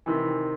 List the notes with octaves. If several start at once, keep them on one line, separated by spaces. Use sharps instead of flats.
C3 D#3 E3